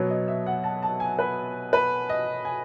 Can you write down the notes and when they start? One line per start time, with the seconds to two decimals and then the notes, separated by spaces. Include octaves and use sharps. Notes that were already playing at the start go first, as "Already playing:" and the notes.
Already playing: B2 F#3 B3 C#5
0.10 D#5
0.28 E5
0.46 F#5
0.64 A5
0.83 A5
1.00 G#5
1.19 B4
1.73 B4
2.09 D#5
2.45 G#5